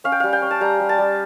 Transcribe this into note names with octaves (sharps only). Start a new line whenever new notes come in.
C#4 F5
G5
G3 F5
G5
C#4
A5
G3 A#5
G3
A5
G3